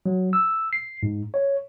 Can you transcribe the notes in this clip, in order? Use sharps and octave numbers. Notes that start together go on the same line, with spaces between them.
F#3
E6
C7
G#2
C#5